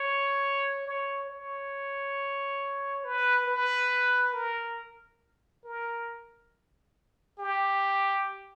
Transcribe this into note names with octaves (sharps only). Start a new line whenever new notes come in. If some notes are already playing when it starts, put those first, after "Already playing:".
Already playing: C#5
C#5
C#5
B4
B4
A#4
A#4
G4